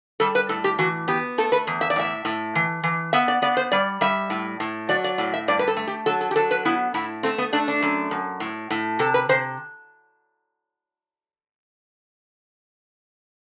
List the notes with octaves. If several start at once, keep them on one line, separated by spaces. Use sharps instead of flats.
G3 A4
B4
A2 A4
G4
E3 F#4
B3 G4
A3 A4
B4
E2
E5
D5
A2 E5
A2
E3
E3
B3 E5
D5
B3 D5
C5
G3 D5
G3 E5
A2
A2
F#3 D5
D5
A2 D5
E5
G2 D5
B4
A4
A3
G4
F#3 A4
A4
G4
F#3 A4
B4
B3 E4
A2 E4
A3 C4
B3
A3 D4
D4
F#2
F#2
A2
A2
C3 A4
B4
C3 C5